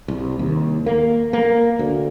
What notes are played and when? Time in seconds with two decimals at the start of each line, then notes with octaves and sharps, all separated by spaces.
0.08 C2
0.39 D#2
0.86 A#3
1.33 A#3
1.79 D2